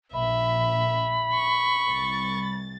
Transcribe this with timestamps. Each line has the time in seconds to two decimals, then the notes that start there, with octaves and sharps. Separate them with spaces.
0.14 A#1 E5 B5
1.34 C#6
1.89 C2 A6